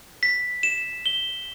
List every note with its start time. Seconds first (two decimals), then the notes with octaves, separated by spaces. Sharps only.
0.23 B6
0.63 E7
1.06 G7